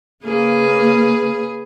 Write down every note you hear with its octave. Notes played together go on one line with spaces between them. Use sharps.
C#3 A#3 G#4 B4